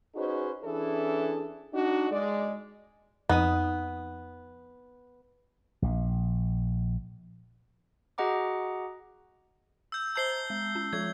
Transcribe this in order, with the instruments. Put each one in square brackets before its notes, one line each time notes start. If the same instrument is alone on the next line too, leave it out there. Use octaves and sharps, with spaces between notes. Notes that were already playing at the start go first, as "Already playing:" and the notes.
[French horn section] C#4 D#4 F#4 G#4 B4 C5
E3 C#4 D4 E4 G#4 A4
D4 D#4 F#4
G#3 D5
[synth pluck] F2 D#4 D#6 [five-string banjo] B3
[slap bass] A#1
[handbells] F#4 G#4 D#5 F#5 A#5 D6
[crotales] E6 G6
[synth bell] C5 A5 A#5 [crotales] G6 C7 G7
[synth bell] G#3
C#4
[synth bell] F3 G#3 F4 [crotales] G#6